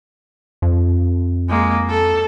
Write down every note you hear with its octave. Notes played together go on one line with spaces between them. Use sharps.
F2
G#3 A#3
A4